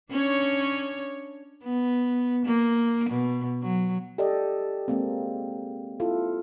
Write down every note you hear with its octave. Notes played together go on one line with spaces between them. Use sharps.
C#4 D4 C#5
B3
A#3
B2
F#3
G4 A4 D5 D#5
G#3 A#3 C4
E4 F4 A4